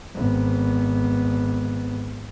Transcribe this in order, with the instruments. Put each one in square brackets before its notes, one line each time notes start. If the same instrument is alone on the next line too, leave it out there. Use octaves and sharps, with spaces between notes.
[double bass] G#1 B3